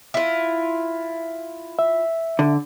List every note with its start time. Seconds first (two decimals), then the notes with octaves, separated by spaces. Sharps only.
0.14 E4 F4
1.79 E5
2.39 D3